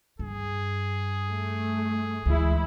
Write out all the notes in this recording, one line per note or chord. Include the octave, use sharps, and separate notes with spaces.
G2 G#4
A3
D2 E3 G#3 E4